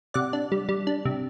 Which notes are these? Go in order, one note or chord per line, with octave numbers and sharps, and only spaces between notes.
C3 D5 F#5
D4
G3
G3
D4
C3